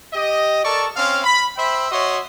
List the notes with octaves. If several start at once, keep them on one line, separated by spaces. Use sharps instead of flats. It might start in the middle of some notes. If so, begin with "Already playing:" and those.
G4 D#5
A4 A#4 D5 A5 C#6
C4 C#4 F5
B5
C5 E5 G5 B5
F#4 C#5 D#5 E5 C6